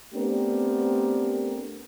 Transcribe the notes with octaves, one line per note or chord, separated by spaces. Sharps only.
A3 B3 C4 D4 G4 A#4